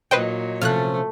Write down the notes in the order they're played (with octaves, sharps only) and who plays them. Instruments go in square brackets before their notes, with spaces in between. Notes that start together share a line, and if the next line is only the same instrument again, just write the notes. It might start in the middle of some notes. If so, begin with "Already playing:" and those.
[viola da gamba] A#2 F#3 [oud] D#4 D#5 [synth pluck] B4 C5 G5
[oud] C3 F3 C#4 [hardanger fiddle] A3 [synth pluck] F6 F#6